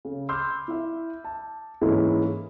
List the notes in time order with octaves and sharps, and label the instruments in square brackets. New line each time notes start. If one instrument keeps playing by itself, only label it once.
[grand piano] C#3
B5 C6 D6 E6 F6 G6
E4 E5
A5
G#2 E3 G#3 A#3 C#4 E4